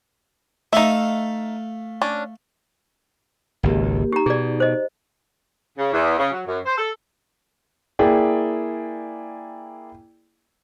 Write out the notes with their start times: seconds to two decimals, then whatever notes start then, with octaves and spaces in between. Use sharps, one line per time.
0.73 A3 D#4 E5 F5
2.02 C#4 D4
3.63 G#1 C#2 A#3 G4 A#4
4.13 D#4 G4 A#5
4.26 B2 G#4 D5
4.60 C5 D#5
5.78 C#3
5.93 E2
6.18 C#3
6.32 F#3
6.46 F#2
6.66 C5
6.78 A4
7.99 A#3 E4 G#4 D5 G5